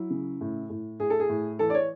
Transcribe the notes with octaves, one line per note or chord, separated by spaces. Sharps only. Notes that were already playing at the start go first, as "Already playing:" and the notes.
Already playing: F#3 E4
C#3
A2
A2
A2 G#4
A4
G#4
A2
E3 A4
D5
C#5